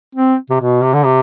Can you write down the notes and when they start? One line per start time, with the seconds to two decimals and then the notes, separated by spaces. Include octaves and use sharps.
0.15 C4
0.50 C3
0.60 B2
0.82 C3
0.93 D3
1.04 C3